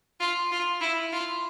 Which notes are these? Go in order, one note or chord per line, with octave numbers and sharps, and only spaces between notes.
F4
F4
E4
F4